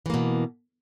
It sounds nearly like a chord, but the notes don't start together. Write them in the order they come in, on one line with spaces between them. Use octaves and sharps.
E3 A#3 B2